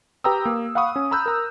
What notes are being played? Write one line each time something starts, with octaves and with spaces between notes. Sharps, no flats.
G4 B4 G5 A#5 D#6 E6
A#3
F5 F#5 B5 C#6 D#6
C#4
A#5 B5 E6 F#6 G6
A#4 A#5